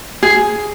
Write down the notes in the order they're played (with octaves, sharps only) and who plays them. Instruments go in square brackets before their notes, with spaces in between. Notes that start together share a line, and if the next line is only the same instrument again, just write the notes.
[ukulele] G#4